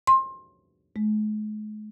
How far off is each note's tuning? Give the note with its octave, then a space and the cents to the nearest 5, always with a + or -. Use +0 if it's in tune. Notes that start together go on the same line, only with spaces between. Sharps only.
C6 +25
G#3 +45